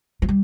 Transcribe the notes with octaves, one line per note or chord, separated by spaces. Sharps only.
F3
G3